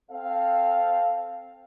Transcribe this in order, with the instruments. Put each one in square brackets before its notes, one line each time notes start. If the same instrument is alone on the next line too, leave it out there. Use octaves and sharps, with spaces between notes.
[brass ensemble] C4 A4 F5